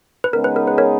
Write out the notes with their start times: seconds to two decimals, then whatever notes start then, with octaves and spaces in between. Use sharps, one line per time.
0.24 B4
0.33 C#3 G#3 B3 D#4 G#4 A#4
0.44 B4
0.56 A#4
0.67 B4
0.78 A#4 C#5